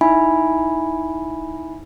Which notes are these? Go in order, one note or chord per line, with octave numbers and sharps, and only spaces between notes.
D#4 E4 E5 G#5 B5